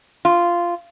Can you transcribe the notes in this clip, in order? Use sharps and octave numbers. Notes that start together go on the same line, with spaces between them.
F4